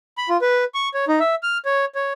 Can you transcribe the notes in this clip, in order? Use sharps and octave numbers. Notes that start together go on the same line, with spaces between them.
B5
F4
B4
C#6
C#5
D#4
E5
F6
C#5
C#5